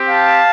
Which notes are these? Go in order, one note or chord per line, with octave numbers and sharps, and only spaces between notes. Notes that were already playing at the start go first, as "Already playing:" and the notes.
Already playing: C4 G4
F5 A5